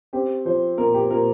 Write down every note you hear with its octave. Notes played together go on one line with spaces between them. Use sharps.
C4 G4
F3 C5
A#2 A#4
G4
A#2 A#4